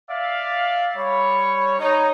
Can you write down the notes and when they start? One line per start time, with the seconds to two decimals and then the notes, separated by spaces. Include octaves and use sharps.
0.10 D5 E5 F5
0.96 G3 C#5 B5
1.79 D#4 C#5